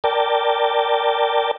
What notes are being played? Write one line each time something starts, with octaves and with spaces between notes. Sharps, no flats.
A#4 D5 G5 A5